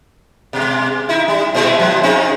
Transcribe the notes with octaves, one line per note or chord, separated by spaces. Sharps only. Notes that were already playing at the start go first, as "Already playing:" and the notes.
B2 G#3
D#4 E4
G3
A#2 G#3 E4
F3 F#3 G#3
C#3 C4 D#4